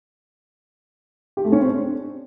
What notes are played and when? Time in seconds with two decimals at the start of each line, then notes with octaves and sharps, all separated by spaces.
1.37 G4
1.45 A3
1.52 C#4
1.60 C4
1.68 D4